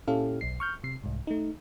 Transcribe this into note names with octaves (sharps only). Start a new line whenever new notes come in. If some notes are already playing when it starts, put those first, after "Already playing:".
A#2 C#4 E4 G4 A4 F5
B1 C7
C#6 F6 G6
C3 C7
C2 G#2
A3 D#4